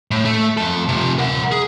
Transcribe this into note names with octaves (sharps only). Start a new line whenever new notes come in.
A2
A3
F2 A4
C3 F3
A#4 F#5
G#4